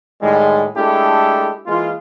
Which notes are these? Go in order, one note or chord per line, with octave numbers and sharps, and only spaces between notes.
A2 D#3 G3 G#3
G#3 A3 D4 E4 G4 A4
E3 G#3 A#3 F4